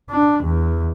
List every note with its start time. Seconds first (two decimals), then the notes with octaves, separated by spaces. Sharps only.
0.10 D4
0.44 E2